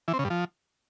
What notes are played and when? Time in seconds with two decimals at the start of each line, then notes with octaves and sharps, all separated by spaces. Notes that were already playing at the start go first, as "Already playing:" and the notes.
0.08 E3
0.13 C4
0.19 C#3
0.25 G2
0.30 F3